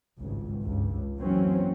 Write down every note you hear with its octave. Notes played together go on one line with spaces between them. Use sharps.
G#1 C#2 G2
C#2 G2
F#2 E3 F#3 A#3 C4 C#4